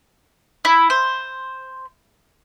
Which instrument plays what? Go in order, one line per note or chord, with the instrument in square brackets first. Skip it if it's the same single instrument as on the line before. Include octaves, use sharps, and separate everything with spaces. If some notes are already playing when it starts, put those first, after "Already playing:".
[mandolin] E4
C5